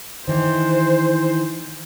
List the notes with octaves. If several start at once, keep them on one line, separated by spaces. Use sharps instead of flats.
D#3 E3 C5